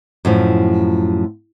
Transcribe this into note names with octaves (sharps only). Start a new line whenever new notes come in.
F#2 A2 F3